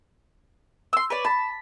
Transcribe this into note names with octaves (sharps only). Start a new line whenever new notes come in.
C6 E6
B4 C#5 D5
A5 B5